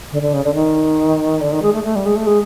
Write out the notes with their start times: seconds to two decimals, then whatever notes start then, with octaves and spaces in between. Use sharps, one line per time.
0.12 D3
0.22 D3
0.34 C#3
0.44 D3
0.55 D#3
1.41 D3
1.52 D#3
1.62 G#3
1.73 A3
1.84 A3
1.96 G3
2.06 G#3
2.16 A3
2.27 G#3